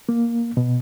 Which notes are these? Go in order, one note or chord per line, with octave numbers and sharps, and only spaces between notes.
A#3
B2